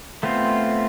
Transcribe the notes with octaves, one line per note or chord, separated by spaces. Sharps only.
A3 B3 C4 F4